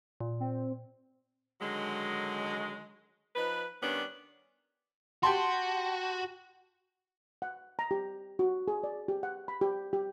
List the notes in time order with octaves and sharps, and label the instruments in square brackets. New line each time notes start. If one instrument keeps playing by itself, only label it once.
[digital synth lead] A#2
[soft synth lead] C4
[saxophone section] D3 D#3 F#3 G#3
F3 D#4 B4
D#3 G3 B3 C#4 D4
[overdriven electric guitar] F#4 [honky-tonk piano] G4 A5 C6
[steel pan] F#5
A#5
G4
F#4
G#4
D5
G4
F#5
B5
G4
G4